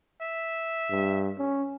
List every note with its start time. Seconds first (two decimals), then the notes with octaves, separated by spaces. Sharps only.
0.22 E5
0.90 G2
1.38 C#4